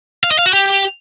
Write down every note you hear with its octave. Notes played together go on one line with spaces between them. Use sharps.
F5
D#5
F5
F#4
G4